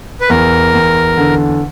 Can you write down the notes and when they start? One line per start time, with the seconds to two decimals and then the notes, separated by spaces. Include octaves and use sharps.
0.21 B4
0.29 E2 A#4
0.74 E2
1.17 D3